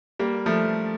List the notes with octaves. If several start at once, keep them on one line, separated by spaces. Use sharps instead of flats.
G3 A#3
F3 A3